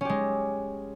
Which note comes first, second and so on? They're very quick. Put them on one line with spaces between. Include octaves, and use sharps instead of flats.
C#4 G4 G#3